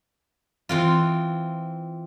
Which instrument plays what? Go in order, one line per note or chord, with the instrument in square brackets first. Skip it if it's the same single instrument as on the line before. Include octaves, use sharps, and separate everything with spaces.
[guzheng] E3 C4 F4